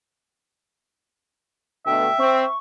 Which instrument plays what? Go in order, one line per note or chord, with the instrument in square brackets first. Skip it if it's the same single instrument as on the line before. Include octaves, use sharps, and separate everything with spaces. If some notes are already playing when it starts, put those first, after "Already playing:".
[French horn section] B2 D3 A3 [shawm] E5 [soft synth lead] G5
[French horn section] C4 [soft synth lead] C#6